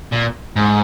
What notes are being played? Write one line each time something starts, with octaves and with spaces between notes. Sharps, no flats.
A#2
G#2